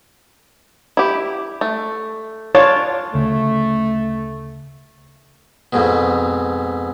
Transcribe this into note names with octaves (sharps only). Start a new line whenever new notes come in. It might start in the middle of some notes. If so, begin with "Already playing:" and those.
E4 G4
A3
D4 F4 C#5 A5
D2 C#3 A3
F2 G#2 B2